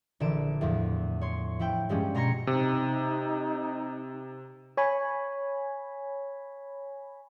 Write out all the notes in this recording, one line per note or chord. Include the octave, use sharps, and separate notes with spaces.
A#1 D3 E3 D7 E7
E2 A2 F3
C#5 C6
F3 E4 G5
G2 F3 G3 G#3 C#4
B2 A#5 C6 G#6 A#6 C#7
C3 D#4
C#5 G#5 B5